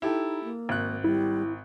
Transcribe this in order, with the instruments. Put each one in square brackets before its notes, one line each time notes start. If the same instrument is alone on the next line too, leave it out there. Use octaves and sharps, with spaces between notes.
[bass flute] D#4 [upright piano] E4 G4 A4
[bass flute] A#3
[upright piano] G#1 F#6
[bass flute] G3 [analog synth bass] E4